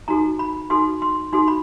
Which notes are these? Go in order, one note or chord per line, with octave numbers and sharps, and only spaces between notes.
D#4 F#4 A4 A#5
B5
D#4 F#4 A4 C6
C6
D#4 F#4 A4 C6
B5